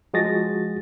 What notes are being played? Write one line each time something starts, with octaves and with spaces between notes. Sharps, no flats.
F3 G#3 F#4 G#4 A6 A#6